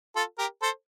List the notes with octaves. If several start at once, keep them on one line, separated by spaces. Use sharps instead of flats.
F4 A4
G4 A#4
A4 C5